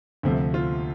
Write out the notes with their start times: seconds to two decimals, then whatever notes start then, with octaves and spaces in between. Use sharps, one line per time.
0.23 D2 C3 F3 A3
0.54 F4